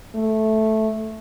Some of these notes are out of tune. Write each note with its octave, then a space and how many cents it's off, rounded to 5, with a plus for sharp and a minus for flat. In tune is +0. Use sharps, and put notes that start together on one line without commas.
A3 -5